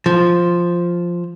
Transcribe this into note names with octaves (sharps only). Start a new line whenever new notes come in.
F3